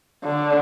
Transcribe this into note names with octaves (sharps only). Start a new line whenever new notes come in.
D3